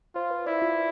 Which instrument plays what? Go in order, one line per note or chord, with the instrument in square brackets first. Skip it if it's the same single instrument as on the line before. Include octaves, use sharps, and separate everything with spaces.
[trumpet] F4 [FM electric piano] C5
[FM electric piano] B4
[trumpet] E4 [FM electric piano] D5
[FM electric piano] F4